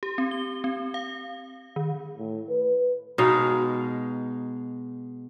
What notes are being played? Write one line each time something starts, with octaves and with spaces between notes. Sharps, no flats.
G4
C4
G7
C4
F5
D#3
A2
B4
B2 G#3 D#4 F5